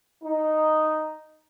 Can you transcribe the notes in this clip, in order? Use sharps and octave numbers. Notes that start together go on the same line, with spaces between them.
D#4